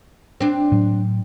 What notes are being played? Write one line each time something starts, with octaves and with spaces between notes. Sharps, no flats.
C4 D4
A2 F#3